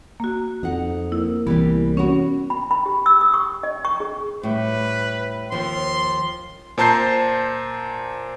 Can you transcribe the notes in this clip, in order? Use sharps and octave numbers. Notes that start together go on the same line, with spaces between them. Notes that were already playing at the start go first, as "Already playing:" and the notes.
A#3 F#4
F2 D#4 F#5
A#3 E4
C2 E3 G3 B3 G4
B3 C#4 F#4 C#5
B5
B5
G4
E6
D#6
C#6
D#5
C#6
G#4
A2 G3 B4
D#2 F3 C6
A#2 C5 A5 A#5 G6 C7